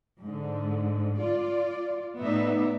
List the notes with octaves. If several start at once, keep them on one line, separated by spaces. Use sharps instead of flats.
G#2 D3
F4 D5
A2 B3 D#4 D5 E5